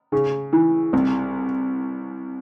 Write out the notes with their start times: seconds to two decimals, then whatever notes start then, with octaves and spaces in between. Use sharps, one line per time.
0.12 C#3
0.53 E3
0.93 C2